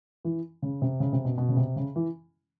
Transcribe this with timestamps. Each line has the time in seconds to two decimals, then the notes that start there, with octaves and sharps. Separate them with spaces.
0.25 E3
0.62 C#3
0.82 C3
1.00 C#3
1.13 C3
1.25 B2
1.38 B2
1.48 C#3
1.57 C3
1.76 C#3
1.96 E3